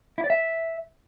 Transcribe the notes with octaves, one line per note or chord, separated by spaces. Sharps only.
E4
D5
E5